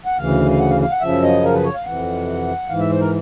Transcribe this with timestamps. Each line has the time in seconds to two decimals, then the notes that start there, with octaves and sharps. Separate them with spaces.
0.05 F#5
0.18 D2 C#3 E3 F5
0.51 F5
0.60 F#5
0.70 F5
0.81 F5
0.91 F#5
1.01 F#2 C#3 F3 E5
1.23 D#5
1.43 A#4
1.54 B4
1.64 C#5
1.74 F5
1.85 F2 C3 E3 F#5
2.69 G#2 E3 F5
2.80 E5
2.89 C5
3.00 A#4